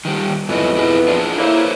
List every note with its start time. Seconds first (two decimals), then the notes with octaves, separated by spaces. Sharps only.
0.05 D#3 G3
0.49 F2 G#2 E3 F#3 B3 D#5
0.77 E4 G#4 D#5
1.08 D4 F4 G#4
1.39 A#3 E4 A4 C5 C#5